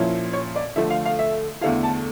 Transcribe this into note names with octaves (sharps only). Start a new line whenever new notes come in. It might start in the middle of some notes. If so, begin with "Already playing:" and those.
Already playing: A#2 F3 C#4 E4
C#5
D5
D3 F3 A3 E5
F5
F5
E5
E2 D3 A3 E4 F5
A5